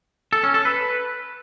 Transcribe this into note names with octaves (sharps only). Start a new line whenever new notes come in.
A4
C#4
A4
B4